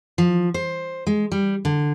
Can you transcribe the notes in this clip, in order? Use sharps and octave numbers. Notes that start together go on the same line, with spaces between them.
F3
C5
G#3
G3
D3